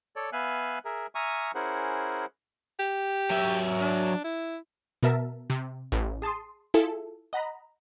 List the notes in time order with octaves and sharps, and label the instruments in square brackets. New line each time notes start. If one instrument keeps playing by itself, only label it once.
[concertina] A4 C#5 D5
B3 E5 F5 G#5 F#6
G#4 A#4 E5
E5 G#5 A#5 C#6 D#6 F6
C#4 E4 G#4 A#4 C5 F#5
[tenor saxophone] G4
[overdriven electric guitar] F#3 E5
[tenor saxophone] D4
E4
[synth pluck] B2 B3 A#4 E5 A5
C3
A1
G#4 A5 C6 D#6
E4 F4 G#4 A4
D#5 F#5 A#5 B5